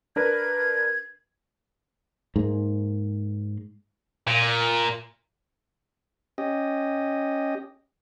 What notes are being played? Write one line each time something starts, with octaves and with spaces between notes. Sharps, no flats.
D4 A#4 B4 G#6
G#2 A#3
A#2
C#4 G4 D#5